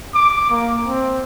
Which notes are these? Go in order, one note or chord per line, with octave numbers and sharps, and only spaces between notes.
D6
A#3
C4